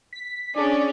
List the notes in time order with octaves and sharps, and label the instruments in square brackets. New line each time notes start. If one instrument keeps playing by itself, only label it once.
[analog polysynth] B6
[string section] C#4 [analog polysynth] D4 G#4 [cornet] D5